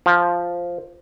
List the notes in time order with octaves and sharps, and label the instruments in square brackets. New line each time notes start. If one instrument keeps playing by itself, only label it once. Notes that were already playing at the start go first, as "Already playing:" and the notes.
[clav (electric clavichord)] F3